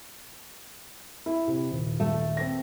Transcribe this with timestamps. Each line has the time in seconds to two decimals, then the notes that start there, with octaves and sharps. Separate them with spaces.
1.26 E4
1.47 C3
1.71 D#1
2.00 A3
2.37 C4 A#6